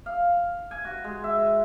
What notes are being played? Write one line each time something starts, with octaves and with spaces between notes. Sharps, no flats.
F5
G#5
F#4
G#3
E5